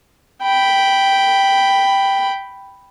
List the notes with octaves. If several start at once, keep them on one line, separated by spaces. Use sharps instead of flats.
G5 B5